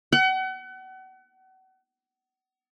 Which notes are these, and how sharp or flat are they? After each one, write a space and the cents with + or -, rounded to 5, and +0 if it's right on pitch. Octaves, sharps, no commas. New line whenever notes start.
F#5 +35